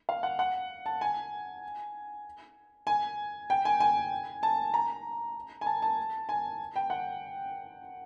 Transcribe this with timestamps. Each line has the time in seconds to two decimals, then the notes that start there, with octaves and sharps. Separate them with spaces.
0.09 F5
0.23 F#5
0.39 F#5
0.86 A5
1.01 G#5
2.87 G#5
3.50 G5
3.65 G#5
3.80 G#5
4.43 A5
4.74 A#5
5.61 G#5
5.66 A5
5.82 A5
6.29 G#5
6.76 G5
6.90 F#5